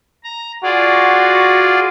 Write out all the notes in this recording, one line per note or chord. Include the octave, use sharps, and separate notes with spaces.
A#5
F4 F#4 G#4 D5